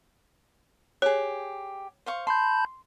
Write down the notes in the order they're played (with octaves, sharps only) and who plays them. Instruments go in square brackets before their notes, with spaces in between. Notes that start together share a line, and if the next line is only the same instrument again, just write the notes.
[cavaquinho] G4 G#4 [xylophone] C#5
[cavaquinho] C5 F5 C#6
[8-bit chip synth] A5 B5 G6 [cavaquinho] C6